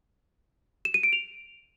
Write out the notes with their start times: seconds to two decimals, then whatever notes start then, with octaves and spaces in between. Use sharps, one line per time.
0.85 E7
0.94 D#7
1.03 D7
1.13 F7